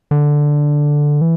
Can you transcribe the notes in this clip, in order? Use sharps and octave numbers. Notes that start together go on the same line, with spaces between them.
D3
E3